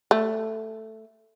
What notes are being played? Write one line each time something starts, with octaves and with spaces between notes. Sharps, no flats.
A3